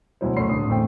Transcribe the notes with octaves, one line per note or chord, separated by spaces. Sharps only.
D2 B2 F#3 E4 C5
F#2 A3 C#4 B5 C6 C7
D1 D3 D#6
A1 E2 A3 C4 G5